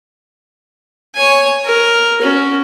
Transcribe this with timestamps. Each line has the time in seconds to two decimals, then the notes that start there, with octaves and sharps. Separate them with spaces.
1.15 C#5 G#5
1.65 A#4
2.22 C#4 F#4